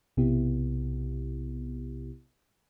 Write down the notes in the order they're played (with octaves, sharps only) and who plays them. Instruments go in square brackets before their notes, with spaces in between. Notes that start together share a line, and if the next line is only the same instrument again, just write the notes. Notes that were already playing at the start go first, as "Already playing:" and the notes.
[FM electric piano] B1 C3 B3 E4 G4